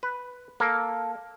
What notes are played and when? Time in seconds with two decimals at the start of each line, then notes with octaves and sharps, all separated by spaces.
0.03 B4
0.60 A#3 A4